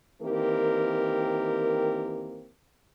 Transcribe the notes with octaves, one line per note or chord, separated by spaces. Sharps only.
D#3 E3 A#3 C4 G4 A#4